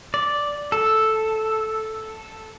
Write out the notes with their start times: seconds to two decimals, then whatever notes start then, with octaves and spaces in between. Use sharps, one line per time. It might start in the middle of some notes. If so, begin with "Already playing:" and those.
0.14 D5
0.72 A4